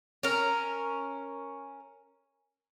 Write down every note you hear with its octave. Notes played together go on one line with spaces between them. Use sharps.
C#4 A#4